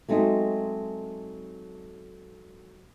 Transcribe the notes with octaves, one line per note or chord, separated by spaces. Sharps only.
F#3 G#3 A3 C4 D#4